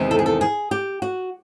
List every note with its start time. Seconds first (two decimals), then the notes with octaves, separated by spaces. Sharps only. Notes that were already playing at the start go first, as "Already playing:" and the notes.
Already playing: E2 C3 D#3 G#3 B3
0.11 A4
0.19 G#4
0.26 A4
0.41 G#4
0.71 G4
1.02 F#4